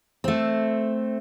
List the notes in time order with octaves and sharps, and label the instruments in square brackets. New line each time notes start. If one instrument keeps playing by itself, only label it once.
[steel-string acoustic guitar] A3 C4